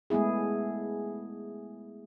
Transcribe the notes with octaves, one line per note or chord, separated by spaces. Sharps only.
G#3 A3 B3 E4 G#4